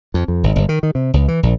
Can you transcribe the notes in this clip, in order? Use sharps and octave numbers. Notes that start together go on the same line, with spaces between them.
F2
F2
G#1
G1
D#3
D#3
C3
C#2
E3
A#1